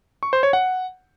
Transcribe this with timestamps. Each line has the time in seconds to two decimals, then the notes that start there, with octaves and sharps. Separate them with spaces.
0.23 C#6
0.33 C5
0.43 C#5
0.53 F#5